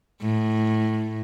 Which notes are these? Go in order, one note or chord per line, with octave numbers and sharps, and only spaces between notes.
A2